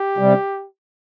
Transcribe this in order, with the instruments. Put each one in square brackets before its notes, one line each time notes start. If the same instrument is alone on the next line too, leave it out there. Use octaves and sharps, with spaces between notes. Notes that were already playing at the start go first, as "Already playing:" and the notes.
Already playing: [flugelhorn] G4
[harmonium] C3 G3